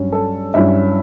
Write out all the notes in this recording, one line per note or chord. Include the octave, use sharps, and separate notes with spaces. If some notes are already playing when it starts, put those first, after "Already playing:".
Already playing: G2 F#3 C#4
A4
G2 F#3 C#4 E4 E5